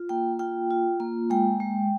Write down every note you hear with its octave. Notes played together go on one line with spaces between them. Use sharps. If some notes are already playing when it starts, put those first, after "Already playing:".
Already playing: F4
A#3 G5
F4 G5
F4
A#3
G#3 G5
G#3